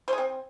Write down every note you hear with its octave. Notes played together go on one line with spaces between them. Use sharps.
C5
G#4
C4